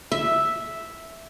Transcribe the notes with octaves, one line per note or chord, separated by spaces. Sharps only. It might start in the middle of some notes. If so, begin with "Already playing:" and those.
E5